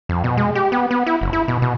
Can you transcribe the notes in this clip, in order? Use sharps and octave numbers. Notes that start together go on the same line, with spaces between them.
F2
B2
G#3
G4
B3
B3
E4
F#1
E4
B2
B2